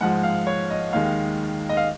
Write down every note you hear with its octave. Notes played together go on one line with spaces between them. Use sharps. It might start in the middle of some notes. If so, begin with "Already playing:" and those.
G#2 F3 G#3 F#5
F5
C#5
D#5
D#2 D#3 G#3 F5
D#5
F5